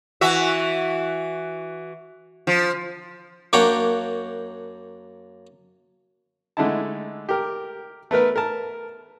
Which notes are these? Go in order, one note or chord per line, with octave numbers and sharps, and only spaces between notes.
E3 F#4 E5
F3
F#2 A#3 D4 C#5 F#5 G5
D3 G#3 A3 D#4 E4 A5
G4 A#4
A3 B3 A#4 B4
A#4 A5